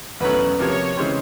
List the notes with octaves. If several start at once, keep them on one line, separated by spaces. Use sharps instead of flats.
E2 B2 F#3 A3 C#4 B4
C3 F3 A#3 C#5
C#3 E3 G#3 C4